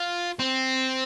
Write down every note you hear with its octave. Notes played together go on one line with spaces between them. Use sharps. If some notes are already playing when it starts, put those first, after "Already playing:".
Already playing: F4
C4